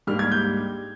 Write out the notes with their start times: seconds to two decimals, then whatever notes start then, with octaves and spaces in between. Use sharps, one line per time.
0.07 G#2 G3 A#3 D4 F6
0.19 G#6
0.32 G6